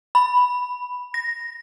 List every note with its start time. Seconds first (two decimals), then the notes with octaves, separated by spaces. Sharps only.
0.15 B5
1.14 A#6